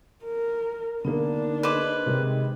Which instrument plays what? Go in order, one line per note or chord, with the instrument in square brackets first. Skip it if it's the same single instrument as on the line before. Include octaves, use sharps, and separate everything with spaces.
[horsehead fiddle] A#4
[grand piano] D3 D#3 A#3 [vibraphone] B3 D#4 [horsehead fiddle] D4
[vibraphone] G#4 D#5 [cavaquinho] B4 C5 D6
[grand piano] C3 D#3 G#3